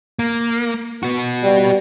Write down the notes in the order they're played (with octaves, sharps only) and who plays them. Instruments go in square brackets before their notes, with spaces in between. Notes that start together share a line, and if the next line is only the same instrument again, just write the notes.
[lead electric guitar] A#3
B3 F#4
[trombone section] G3